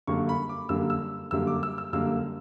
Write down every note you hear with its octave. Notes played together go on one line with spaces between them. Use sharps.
F#2 D3 G3 A#3 C#6
B5
D6
F#2 D3 G3 A#3 E6
E6
F#2 D3 G3 A#3 E6
D6
E6
E6
F#2 D3 G3 A#3 E6